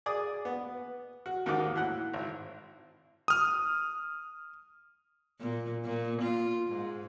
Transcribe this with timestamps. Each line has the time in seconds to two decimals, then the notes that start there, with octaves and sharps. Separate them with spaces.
0.06 G#4 D5 D#6
0.45 B3
1.26 F#4
1.46 D#2 G#2 D#3 D#4 F#4 D6
1.76 A2 F#5
2.13 G#1
3.28 D#6 F6
5.40 A#2
5.85 A#2
6.21 F4
6.67 G#2